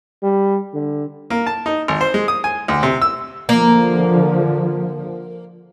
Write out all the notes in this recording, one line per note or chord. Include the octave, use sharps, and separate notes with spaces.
G3
D3
A#3
A5
D#4
G#1
C5
G#3
D#6
G#5
D2
C3
E6
D3 F3 A#3